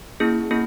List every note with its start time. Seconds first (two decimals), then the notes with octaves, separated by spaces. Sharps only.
0.20 A#3 C#4 E4 G#4
0.51 A#3 C#4 E4 G#4